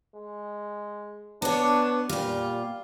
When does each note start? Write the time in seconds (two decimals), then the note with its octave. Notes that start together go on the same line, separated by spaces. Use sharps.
0.15 G#3
1.42 B3 D4 C#5
2.09 A#2 G3 F4